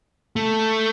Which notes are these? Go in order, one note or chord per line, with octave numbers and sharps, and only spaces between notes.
A3